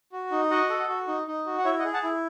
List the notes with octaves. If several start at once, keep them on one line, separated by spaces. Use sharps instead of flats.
F#4
D#4
F#4 D#5 F#5
A4
F#4
D#4
D#4
F#4
F#5
E4 C#5 E5
D#5 F#5
G#4
F#5 A5
E4